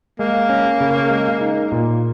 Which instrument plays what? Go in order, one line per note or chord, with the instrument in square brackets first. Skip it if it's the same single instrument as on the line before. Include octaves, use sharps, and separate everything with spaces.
[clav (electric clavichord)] G#3 [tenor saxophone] A#3
[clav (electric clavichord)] C#4
C#3
G#3
D#4
A#2